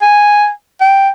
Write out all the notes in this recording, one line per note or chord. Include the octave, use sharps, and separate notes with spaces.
G#5
G5